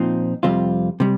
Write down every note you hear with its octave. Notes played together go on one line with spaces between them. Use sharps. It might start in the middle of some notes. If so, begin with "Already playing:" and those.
Already playing: A#2 F3 C4 D#4
F2 C3 G3 C4 F4
C3 G3